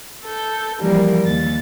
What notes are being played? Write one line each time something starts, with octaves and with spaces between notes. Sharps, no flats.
A4 G6
E3 F3 G3 A#3 A#4
D#2 A6